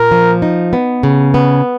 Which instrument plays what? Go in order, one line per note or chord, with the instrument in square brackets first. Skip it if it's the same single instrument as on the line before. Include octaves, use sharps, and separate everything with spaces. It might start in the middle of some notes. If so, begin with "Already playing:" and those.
Already playing: [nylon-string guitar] A#2 [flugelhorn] A#4
[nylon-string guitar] F3
D#4
B3
C#3
B3